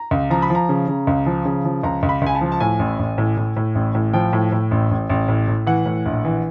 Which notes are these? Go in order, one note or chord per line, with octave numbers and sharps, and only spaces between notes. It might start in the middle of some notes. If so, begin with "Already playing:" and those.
Already playing: A#5
C#2
F3 A#5
B5
F3
A#5
C#3
C#3
C#2
F3
C#3
F3
C#2 A#5
C#2
B5
C#2 G#5
A5
F3
A5
A2 G#5
A1
A1
A2
A2
A2
A1
A2
F3 G5
A2
A2
A1
A1
A1
A2
A2
E3 F#5
A2
A#1
E3